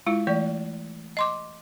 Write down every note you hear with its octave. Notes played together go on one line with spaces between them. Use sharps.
G#3 E4 F4
E3 A3 D5
D#5 C6 D6